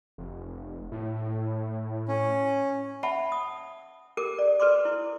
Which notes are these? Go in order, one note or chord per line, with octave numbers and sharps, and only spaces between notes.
F1
A2
C#4
E5 F#5 A5 B5 C#6
D#6
G4 A4 A#4 D6
D5
A4 B4 D5 C6 D6
E4